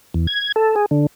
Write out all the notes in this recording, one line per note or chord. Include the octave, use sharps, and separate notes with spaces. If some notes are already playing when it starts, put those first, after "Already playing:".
E2
G#6
A4
G#4
D3